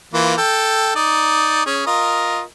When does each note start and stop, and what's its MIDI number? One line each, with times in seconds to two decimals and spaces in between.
0.14 0.34 52
0.14 0.34 58
0.14 0.34 65
0.38 0.93 69
0.38 0.93 79
0.96 1.64 63
0.96 1.64 74
1.66 1.83 61
1.66 1.83 68
1.86 2.41 65
1.86 2.41 70
1.86 2.41 75